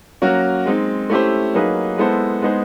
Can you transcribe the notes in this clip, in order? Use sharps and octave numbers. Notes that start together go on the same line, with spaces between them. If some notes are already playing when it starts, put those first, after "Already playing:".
F#3 A#3 C#4 F#4 A#4
G#3 C4 D#4
A3 C#4 E4 G4 C5
F#3 A#3 D#4 G#4 B4
G#3 B3 E4 A4 C5
G#3 B3 D#4 G#4 C5